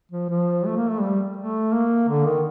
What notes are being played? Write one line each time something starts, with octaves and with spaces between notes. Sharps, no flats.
F3
F3
A3
A#3
A3
G3
A3
A#3
D3
D#3